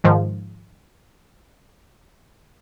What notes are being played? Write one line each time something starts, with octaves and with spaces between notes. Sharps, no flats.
G#2 D#3 F3